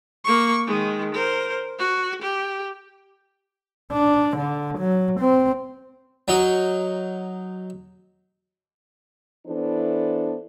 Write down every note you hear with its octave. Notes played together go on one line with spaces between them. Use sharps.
A#3 C#6
D#3 G#3
A#4 C5
F#4
G4
D4
D3
F#3
C4
F#3 D#4
E3 B3 D4 E4 A4 C5